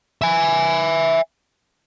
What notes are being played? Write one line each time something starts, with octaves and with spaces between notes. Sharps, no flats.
E5 G#5